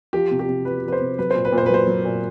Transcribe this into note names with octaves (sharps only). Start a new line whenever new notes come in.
F3 G4
C3
G4
C3
F3 B4
F3 B4
C5
C3
F#3 B4
A#2 C5
B4
A#2
C5
B4
F#3 C5
F#3
A#2